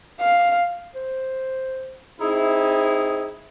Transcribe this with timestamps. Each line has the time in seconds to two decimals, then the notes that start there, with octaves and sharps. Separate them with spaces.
0.20 F5
0.95 C5
2.21 C4 D#4 E4 G#4